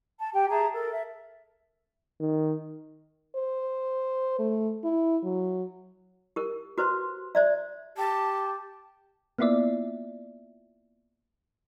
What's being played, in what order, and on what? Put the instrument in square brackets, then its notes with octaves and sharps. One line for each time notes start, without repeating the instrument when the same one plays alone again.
[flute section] A5
G4 G5
G#4 E5 A5 A#5
A4 A#4
E5
[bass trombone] D#3
[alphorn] C5
A3
E4
F#3
[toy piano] G4 A#4
F#4 B4 C5 C6
C5 D5 E5
[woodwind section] G4 [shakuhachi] A5
[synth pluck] A#3 B3 E4 F4 D5 E5